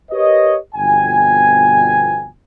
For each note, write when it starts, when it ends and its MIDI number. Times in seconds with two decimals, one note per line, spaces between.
0.11 0.57 67
0.11 0.57 70
0.11 0.57 71
0.11 0.57 73
0.11 0.57 75
0.75 2.28 31
0.75 2.28 41
0.75 2.28 47
0.75 2.28 79
0.75 2.28 80